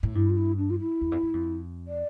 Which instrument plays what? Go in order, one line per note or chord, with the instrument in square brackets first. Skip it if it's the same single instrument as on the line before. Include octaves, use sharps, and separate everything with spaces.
[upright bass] A2
[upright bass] G2 [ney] E4
[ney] F4
E4
D4
F4
E4
[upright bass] E2
F2
G2
F2
[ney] D5